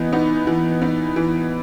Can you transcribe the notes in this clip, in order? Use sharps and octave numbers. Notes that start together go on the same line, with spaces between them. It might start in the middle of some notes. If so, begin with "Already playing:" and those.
Already playing: E3 B3 D#4
B3 D#4
E3
B3 D#4
E3